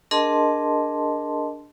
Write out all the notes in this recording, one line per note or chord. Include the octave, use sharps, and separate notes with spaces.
D4 G#4 A#4 D#5 A5 C6